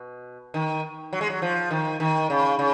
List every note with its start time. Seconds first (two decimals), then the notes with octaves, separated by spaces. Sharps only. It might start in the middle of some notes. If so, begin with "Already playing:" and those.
Already playing: B2
0.54 D#3
1.13 F#3
1.21 G#3
1.30 F#3
1.42 F3
1.71 D#3
2.00 D#3
2.30 C#3
2.59 C#3